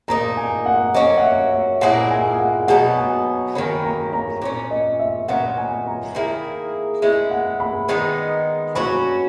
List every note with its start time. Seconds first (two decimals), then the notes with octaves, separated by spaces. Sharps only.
0.08 A#2 A#3 D#4 A#5
0.37 G#5
0.66 F#5
0.95 F#3 A#3 C#4 D#5
1.18 F#5
1.23 E5
1.52 E5
1.81 A#2 A#3 E4 G#4 F#5
2.11 G#5
2.31 G#5
2.39 F#5
2.68 B2 F#3 B3 D#4 F#5
2.97 G#5
3.55 D#3 F#3 A#3 C#4 B5
3.84 A#5
4.13 A#5
4.42 A#2 A#3 C#4
4.71 D#5
4.99 E5
5.28 A#2 F#3 B3 F#5
5.58 G#5
5.87 A#5
6.15 D#3 A#3 E4 G#4
7.02 G#3 C#4 E4 E5
7.31 F#5
7.60 B5
7.89 D#3 G#3 B3 D#4
8.75 F#3 C#4 F#4 B5